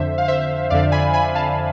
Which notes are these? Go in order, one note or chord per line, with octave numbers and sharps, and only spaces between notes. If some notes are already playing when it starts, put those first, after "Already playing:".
Already playing: F2 D3 C5 E5
F5
C5 E5
F2 D3 D5 F5
G#5 B5
G#5 B5
F5 A5